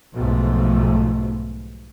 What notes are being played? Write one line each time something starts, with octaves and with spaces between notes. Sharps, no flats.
B1 G#2 B2 F3 A3